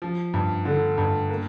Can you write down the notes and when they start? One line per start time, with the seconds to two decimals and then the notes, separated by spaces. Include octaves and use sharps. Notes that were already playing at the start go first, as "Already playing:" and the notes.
0.02 F3
0.34 G2
0.65 D3
0.98 G2
1.30 A#3